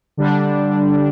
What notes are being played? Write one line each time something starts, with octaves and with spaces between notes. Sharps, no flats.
D3 G3 D4
D4